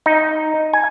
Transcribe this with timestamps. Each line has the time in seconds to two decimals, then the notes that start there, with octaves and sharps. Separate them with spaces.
0.06 D#4
0.73 G#5